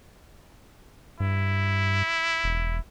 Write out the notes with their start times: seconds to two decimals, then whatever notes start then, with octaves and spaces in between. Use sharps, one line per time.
1.20 G2 E4
2.44 E1